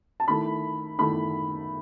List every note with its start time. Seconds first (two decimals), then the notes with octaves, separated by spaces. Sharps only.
0.20 A5
0.28 D#3 A3 E4 B5
0.99 D#3 A3 E4 B5